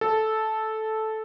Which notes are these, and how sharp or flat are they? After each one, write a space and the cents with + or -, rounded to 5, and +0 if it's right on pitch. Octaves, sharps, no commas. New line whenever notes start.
A4 -10